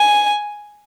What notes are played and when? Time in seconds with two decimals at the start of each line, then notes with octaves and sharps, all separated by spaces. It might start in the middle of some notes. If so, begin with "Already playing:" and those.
Already playing: G#5